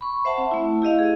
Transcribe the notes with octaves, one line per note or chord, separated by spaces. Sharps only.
B5 C#6
C5 E5 F#5 A5
C4
A3 E4
E4 G4 D#5 F5
G#4